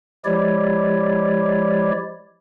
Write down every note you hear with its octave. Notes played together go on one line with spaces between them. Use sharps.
F3 G#3 E4 G4 C#5 D5